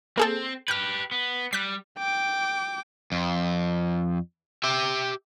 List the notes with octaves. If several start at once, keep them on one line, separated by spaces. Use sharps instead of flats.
A#3 C4 G#4 A4
G4 B4 F6 G6
B3
G3 F#6 B6
G5 D6
F2
G4 E5